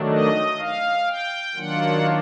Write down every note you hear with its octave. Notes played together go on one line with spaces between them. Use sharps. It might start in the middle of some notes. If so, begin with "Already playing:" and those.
Already playing: D#3 F#3 A3 D4
D#5
F5
G5
D#3 F#3 A#3 D4 F4 F#5